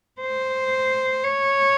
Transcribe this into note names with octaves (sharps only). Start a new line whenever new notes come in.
C5
C#5